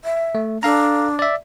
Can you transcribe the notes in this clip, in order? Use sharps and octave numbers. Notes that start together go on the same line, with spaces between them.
E5
A3
D4 A4 F5 A#5
D5 E5